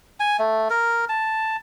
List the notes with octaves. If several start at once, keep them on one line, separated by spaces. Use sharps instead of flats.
G#5
A3
A#4
A5